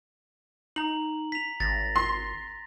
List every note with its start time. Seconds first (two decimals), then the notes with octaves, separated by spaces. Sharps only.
0.76 D#4 A#5 F#7
1.32 B6 F7
1.60 G#1 A6 A#6
1.96 C6